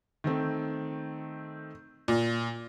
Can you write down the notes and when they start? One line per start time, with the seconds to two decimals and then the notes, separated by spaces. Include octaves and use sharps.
0.24 D#3 A3 C4
2.08 A#2